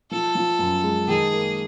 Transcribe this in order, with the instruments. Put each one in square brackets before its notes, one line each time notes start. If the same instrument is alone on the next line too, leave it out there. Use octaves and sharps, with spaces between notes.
[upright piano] F3 [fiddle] A4
[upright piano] F3
F#2
G#3
[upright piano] D#3 [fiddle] G#4
[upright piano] A#3